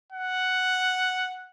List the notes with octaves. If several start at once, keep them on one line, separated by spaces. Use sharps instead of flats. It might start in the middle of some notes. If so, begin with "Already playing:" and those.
F#5